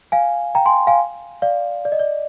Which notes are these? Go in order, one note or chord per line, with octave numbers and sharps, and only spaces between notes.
F5 G#5
G5 A#5
G#5 C6
F5 G#5
D5 F5
D5
D#5
D5